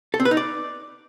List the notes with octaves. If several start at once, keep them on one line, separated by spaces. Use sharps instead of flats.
A4
C4
B4
D#4
D5